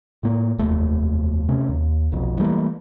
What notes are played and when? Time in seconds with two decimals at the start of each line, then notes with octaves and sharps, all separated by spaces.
0.23 A2 A#3
0.58 F1 D#2 A3
1.49 C3 A3 C#4
1.69 D#2
2.12 F1 B1 F2
2.39 E3 G3 A3 A#3